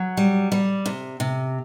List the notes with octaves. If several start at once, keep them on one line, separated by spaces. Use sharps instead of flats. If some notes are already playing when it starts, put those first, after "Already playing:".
Already playing: F#3
G3
G3
C3
C3